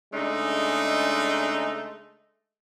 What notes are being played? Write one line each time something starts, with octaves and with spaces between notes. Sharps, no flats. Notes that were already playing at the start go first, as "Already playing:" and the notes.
C#3 G#3 A3 D4 D#4